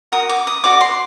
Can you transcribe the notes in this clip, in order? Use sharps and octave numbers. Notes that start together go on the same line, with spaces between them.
F#4 A#4 D#6
D6
D#6
F#4 A4 D5 D6
C6